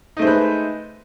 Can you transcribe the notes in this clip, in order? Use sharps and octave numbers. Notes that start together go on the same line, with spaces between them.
G#3 A3 D#4 B4 C5